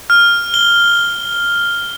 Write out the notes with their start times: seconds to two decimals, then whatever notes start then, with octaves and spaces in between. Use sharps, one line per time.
0.10 F6
0.54 G7